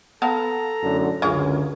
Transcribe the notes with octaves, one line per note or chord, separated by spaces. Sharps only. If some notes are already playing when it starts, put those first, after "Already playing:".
B3 A4 F5 A5 A#5
F#2 A2 D3
C#2 F#2 D3 C#4 F4 G#4